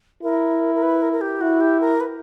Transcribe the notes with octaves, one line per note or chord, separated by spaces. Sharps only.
E4 A#4
A#4
B4
A#4
A#4
G4
E4 F#4
G4
A#4
B4